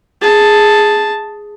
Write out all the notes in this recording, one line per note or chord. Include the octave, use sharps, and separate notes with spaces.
G#4 A5